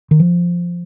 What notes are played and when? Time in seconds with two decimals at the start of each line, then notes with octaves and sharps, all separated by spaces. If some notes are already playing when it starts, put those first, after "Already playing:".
0.11 D#3
0.20 F3